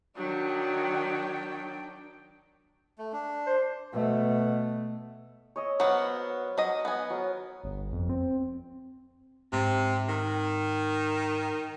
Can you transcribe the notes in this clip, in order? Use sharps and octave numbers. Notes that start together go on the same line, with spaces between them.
D#3 F#3 D4 G5
A3
D4
C5
B2 A3
C#5 D#5 E6
F#3 B3 C5 F5
F#3 D#5
B3 G#5
F#3 A#4
G1
F2
C4
G#2 C3
D#3